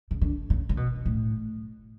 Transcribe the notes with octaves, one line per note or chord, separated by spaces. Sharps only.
C#3
D3
C#3
C#3
B2
A2